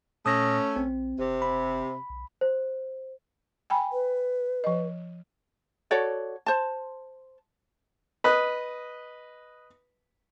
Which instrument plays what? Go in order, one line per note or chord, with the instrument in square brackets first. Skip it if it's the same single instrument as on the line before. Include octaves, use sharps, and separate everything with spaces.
[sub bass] A#2 [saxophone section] A3 C#4 [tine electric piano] D#6 A#6
[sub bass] A#1 [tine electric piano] C4
[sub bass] F#1 [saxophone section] C3
[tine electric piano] B5
[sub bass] B1
[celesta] C5
[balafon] G5 G#5 B5
[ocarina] B4
[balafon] F3 D#5
[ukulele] F#4 A4 C#5 D5
C5 A5
[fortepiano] B4 D#5 F#6